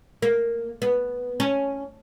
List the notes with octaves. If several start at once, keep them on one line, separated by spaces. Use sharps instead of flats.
A#3
B3
C#4